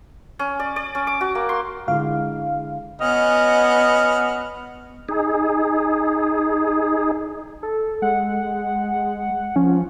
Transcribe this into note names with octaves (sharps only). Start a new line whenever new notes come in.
C#4
D5
D5
C#4
D6
F#4
A#3
C6
D3 G#3 E4 F5
B3 C#4 F#4 D#5 F6
D#4 G#4
A4
G#3 F#5
F3 C#4